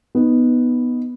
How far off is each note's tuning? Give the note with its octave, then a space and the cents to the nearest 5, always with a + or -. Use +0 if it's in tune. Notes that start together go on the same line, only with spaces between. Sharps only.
B3 +0 D#4 +0